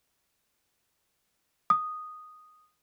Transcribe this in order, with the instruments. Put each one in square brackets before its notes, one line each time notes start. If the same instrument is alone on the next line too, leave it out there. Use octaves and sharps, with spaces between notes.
[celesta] D#6